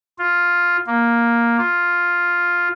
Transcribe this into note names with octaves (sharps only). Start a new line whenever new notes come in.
F4
A#3
F4